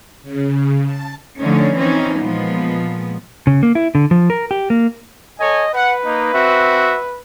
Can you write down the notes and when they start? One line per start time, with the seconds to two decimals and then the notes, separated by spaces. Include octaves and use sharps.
0.23 C#3
0.85 A5
1.40 D3 F3 A3 C#4 D#4
1.77 E3 F3 C4 C#4 D#4
2.20 A#2 F3 G#3 B3
3.47 C#3
3.63 A#3
3.75 E4
3.95 D3
4.11 F3
4.30 A#4
4.51 G4
4.70 A#3
5.40 A4 C#5 D#5 G#5
5.74 B4 F#5
6.05 A#3 D#4
6.34 C4 F#4 E5